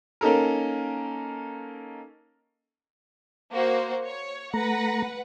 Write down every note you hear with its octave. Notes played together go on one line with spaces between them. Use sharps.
A#3 C#4 D#4 A4 A#4
A#3 F#4 C5
C#5
A3 B4 F#5 A#5